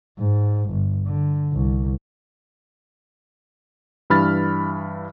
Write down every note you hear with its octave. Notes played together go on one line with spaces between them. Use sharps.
G#2
G1
D3
C2
G2 E3 B5 F6 A6